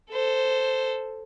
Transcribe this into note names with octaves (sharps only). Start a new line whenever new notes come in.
A4 C5